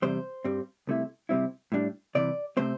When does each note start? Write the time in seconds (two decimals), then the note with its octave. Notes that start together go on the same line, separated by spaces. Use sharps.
0.02 E2 C3 G3 C5
0.45 G2 G3 C4
0.87 C2 C3 A3 E4
1.29 C3 G3 C4 E4
1.72 A2 G3 D4
2.15 C2 C3 E3 D5
2.57 C3 A3 C4 C5